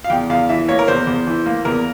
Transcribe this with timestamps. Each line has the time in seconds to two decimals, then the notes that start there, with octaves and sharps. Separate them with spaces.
0.04 F5
0.10 E2 G5
0.29 E2 F5
0.49 E3 E5
0.68 A#3 C#5
0.79 A#4
0.88 E2 C5
1.07 E2
1.27 E3
1.46 A#3
1.65 E2 A#4